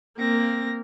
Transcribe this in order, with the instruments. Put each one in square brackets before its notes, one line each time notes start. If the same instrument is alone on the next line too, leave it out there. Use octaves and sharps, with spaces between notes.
[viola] A#3 [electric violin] C4 A#6